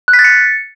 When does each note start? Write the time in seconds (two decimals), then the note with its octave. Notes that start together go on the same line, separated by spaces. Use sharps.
0.08 F#6
0.13 B6
0.19 A6
0.24 C#7